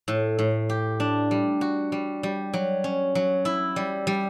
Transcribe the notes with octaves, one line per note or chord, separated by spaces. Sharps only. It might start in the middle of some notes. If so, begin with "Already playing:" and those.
A2
A2
G4
D4
G3
F#4
G3
G3
F#3
C#4
F#3
E4
G3
G3